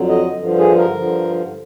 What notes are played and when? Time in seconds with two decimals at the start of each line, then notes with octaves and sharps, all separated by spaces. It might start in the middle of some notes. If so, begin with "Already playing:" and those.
Already playing: F2 D3 F#3
0.09 D#5
0.38 G2 D3 F3
0.58 G#4
0.77 A#4
0.96 G2 D3 F3